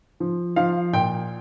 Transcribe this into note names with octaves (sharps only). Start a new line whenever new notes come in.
F3
F3 F5
A#2 G5